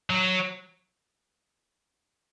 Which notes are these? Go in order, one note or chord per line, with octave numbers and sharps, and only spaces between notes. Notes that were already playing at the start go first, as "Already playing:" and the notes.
F#3